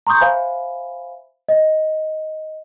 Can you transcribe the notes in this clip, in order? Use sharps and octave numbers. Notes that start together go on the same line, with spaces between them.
A#5 C6 C#6 D#6 G6
C5 E5 F5 G#5 B5
D#5